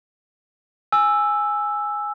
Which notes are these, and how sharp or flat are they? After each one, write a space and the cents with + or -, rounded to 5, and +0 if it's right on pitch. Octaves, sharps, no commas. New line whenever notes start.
G#5 +0 E6 +0